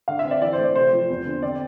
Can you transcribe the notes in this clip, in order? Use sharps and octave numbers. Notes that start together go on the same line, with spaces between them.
D3 F5
E5
C4
D5
E3 D5
C5
A3
D5
C3 C5
F3
E2
D3
C4 D5